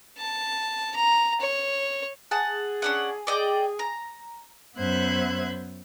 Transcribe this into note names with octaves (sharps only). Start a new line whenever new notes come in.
A5
A#5
C#5
G#4 F#5 A5
C#4 D4 F#5
D5 D#5 G5
A#5
F#2 B3 C5 E5 F#6 G#6